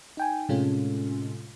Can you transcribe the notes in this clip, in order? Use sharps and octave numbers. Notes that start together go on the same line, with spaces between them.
D#4 G5 G#5
A2 C3 G#3 C#4 F4 A4